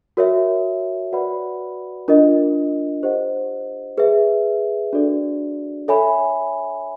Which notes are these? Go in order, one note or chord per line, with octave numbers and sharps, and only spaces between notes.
F#4 A#4 C#5 E5
F#4 B4 D5 F#5 B5
D4 F4 A#4 D#5
G4 C5 D#5 F#5
G#4 B4 E5
D4 F#4 A4 D5
A4 C#5 E5 G#5 B5